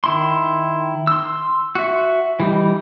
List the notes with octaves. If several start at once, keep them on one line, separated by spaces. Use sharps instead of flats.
D#3 E4 C6
C6 E6
F#4 E5
E3 G3 D#4